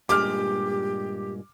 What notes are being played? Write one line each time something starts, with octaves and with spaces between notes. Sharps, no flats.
G2 A#2 G#3 G4 D6 F6